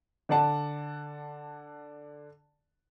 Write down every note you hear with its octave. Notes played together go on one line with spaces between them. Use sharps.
D3 D5 F#5 A5